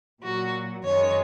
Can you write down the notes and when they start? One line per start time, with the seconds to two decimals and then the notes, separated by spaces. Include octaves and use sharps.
0.22 A#2 F#3 F#4
0.84 F#2 D#3 G#3 C#5